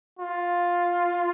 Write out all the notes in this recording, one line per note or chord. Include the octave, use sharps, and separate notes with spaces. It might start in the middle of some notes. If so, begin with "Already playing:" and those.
F4